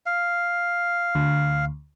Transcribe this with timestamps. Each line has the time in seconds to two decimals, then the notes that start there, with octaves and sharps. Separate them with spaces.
0.06 F5
1.15 D2